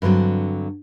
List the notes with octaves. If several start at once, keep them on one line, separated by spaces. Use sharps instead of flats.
G2 D3 E3 F#3 C4